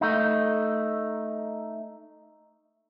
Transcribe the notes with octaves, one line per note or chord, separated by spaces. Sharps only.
A3 D#4